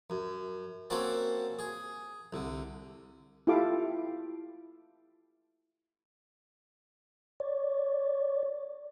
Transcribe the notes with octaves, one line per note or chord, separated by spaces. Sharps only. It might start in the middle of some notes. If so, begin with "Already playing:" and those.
F#2
A#3 C4 C#4 F#4 E5 A5
G#4
C2 D3
E4 F4 G4 A4 F5 D6
C#5 D5